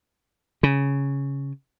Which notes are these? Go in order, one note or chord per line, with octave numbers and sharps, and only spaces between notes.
C#3